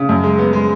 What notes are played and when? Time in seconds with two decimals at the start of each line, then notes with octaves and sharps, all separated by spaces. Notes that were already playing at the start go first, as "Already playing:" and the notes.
Already playing: C#3
0.09 F#2
0.24 G#3
0.39 B3
0.53 G#3